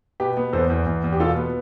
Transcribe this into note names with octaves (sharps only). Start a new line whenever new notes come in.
B2 G4 B4
B3
E2 A4 C5
E2
E2
E2
G4
B2 F4 A4
B3